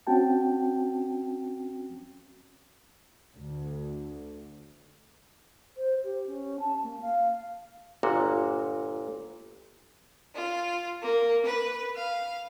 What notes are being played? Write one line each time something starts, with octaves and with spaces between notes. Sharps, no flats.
C4 C#4 F#4 G5 A5
D2
C5
G4
C#4
A5
A#3
F5
G1 A#2 F#4
F4
A#3
B4
F5